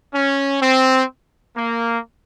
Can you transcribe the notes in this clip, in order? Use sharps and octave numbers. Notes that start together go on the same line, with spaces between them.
C#4
C4
A#3